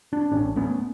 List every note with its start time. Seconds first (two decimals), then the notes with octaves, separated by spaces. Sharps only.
0.13 D4
0.32 A1 C#4 D4
0.56 A3 B3 C#4